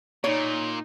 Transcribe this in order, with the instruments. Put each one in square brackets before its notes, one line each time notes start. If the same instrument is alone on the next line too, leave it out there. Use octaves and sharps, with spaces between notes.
[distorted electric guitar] A#2 [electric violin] D#4 [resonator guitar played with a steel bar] C#5